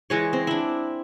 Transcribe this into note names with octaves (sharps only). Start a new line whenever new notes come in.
E3 G#3 C#5
C4
D4 E4